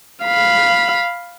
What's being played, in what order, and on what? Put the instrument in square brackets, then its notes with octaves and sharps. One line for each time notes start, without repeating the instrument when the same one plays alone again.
[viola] F5 B5